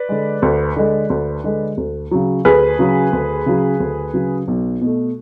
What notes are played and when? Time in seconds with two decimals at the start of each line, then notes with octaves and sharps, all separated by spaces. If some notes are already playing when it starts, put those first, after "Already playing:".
Already playing: B4 D5
0.09 D3 G#3
0.42 D2
0.76 D3 G#3
1.10 D2
1.44 D3 G#3
1.77 D2
2.11 C#3 F#3
2.45 D2 G#4 B4
2.79 C#3 F#3
3.13 D2
3.46 C#3 F#3
3.80 D2
4.14 C#3 F#3
4.48 B1
4.81 B2 A3